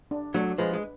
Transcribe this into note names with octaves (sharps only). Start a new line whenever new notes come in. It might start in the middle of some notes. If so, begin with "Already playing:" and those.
D4
F#3 A3 D4
F3 G#3 B4
G#3